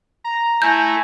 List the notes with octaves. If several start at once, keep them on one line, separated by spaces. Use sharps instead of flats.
A#5
A3 E4 G#5 G6